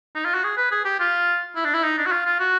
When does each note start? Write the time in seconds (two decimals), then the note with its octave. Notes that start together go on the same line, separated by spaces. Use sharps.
0.15 D#4
0.25 F4
0.34 F#4
0.44 G#4
0.58 B4
0.72 G#4
0.85 G4
1.00 F4
1.56 E4
1.65 D4
1.74 E4
1.83 D#4
1.98 D4
2.06 F#4
2.12 F4
2.26 F4
2.40 F#4